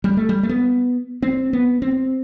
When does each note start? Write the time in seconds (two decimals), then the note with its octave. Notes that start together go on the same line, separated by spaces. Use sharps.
0.04 G3
0.17 A3
0.29 G3
0.43 A3
0.49 B3
1.22 C4
1.53 B3
1.82 C4